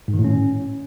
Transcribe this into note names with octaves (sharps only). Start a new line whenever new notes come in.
G#2
D#3
A2
C#4